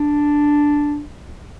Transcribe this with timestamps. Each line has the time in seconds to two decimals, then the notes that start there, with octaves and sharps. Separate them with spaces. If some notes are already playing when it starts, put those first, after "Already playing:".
Already playing: D4